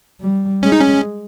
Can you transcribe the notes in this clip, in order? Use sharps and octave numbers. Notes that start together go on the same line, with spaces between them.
G3
G#3 C#4
D#4
C#4